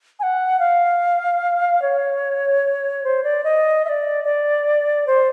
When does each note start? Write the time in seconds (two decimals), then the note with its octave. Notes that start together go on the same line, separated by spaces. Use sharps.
0.19 G#5
0.23 F#5
0.59 F5
1.82 C#5
3.04 C5
3.24 D5
3.44 D#5
3.85 E5
3.89 D5
4.24 D5
5.07 C5